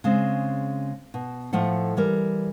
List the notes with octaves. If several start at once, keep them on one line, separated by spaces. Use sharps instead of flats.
C#3 G#3 C4
B2
A2 F3 A3 A4 F#5
E3 G3 A#4